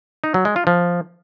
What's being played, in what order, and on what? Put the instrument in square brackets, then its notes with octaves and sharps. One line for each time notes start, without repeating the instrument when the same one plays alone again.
[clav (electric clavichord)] D#4
F#3
G#3
F4
F3